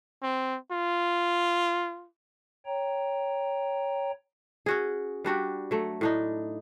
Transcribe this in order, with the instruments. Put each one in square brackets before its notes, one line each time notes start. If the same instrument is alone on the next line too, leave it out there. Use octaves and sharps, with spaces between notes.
[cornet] C4
F4
[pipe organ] C#5 G5 A#5
[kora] C#4 F#4 G#4
G3 D4 F#4 G4
F#3 A3
A2 D4 D#4